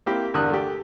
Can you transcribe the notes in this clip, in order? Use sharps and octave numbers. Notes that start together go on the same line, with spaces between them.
A#3 C4 E4 G4
E2 G2 D3 A#4 D#6 F#6
A3 G4